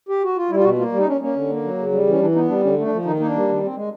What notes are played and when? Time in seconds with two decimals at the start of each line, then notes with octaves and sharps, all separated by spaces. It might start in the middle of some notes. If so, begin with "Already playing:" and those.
0.09 G4
0.23 F#4
0.37 F4
0.50 G3 E4
0.58 F4
0.64 B2 F#4
0.78 A#3 F4
0.92 G3
0.99 D#4
1.07 C#4 D4
1.21 A#3 C#4
1.35 D3
1.50 A#3
1.63 F#3
1.78 C#3
1.92 G3
2.06 E3 C#4
2.20 E3 D4
2.35 B3 D#4
2.48 G3 D4
2.63 D3 C#4
2.78 A3
2.84 D4
2.92 F3
3.05 D#3 D#4
3.20 A#3 D#4
3.27 D4
3.35 G3
3.48 D#3
3.62 C4
3.76 G#3